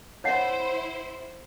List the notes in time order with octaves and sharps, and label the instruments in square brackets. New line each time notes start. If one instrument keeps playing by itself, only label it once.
[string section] E4 C5 [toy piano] C#5 F#5